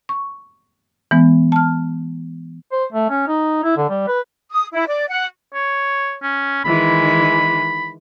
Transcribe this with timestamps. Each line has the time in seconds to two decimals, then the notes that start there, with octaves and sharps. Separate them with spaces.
0.09 C#6
1.11 E3 G#3 B3
1.52 A5 F6
2.72 C5
2.93 A3
3.10 C#4
3.28 D#4
3.64 E4
3.77 D3
3.89 G3
4.08 B4
4.51 D#6
4.73 E4
4.87 D5
5.09 F#5
5.54 C#5
6.22 C#4
6.64 D#3 E3 G#3 B5